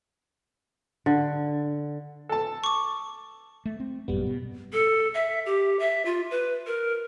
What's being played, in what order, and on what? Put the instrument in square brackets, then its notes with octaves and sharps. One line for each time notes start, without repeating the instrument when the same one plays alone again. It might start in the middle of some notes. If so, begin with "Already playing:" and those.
[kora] D3
[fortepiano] A4 A5
[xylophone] C#6 D6
[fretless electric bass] A3
C4
[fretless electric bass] G#1 F#2 A#2 [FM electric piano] G3 B3
[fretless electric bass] B2
[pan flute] A4
E5
G4
E5
F4
B4
A#4